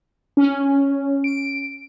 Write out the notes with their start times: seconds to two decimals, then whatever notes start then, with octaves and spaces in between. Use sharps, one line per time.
0.37 C#4
1.24 D7